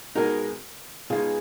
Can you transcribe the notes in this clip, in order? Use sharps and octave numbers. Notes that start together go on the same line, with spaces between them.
B2 G#3 D#4 F#4 A#4
B2 G#3 D#4 F4 G#4